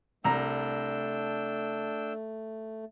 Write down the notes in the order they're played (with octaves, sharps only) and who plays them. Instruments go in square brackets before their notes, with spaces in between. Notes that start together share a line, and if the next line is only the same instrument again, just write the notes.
[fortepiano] C2 A#5 [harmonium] A3 [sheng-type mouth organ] D4 G5 E6